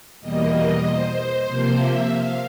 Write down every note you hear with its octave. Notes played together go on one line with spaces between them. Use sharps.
E2 B2 G3 A#3 D#5
D#5
C5
C5
C3 F3 A#3
E5
F5